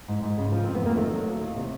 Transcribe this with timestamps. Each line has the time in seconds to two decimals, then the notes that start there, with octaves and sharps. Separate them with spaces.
0.08 G#2
0.23 G#2
0.38 C#3
0.52 F3
0.64 F2 C4
0.75 B3
0.82 F2 A#3
0.96 D#3 A3
1.12 F#3
1.26 D#2
1.41 D#2
1.56 C3